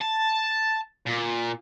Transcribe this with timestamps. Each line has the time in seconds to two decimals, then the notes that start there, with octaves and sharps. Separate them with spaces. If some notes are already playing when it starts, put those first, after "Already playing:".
0.01 A5
1.07 A#2